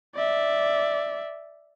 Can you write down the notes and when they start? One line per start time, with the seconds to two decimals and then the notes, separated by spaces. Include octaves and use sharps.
0.15 D5 E5